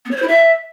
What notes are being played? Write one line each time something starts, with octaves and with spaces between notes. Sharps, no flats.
B3
C#5
C5
E4
E5